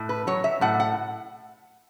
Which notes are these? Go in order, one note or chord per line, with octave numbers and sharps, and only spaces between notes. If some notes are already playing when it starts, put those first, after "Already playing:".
Already playing: A2
B4
F#3 C#5
E5
A2 F#5
F#5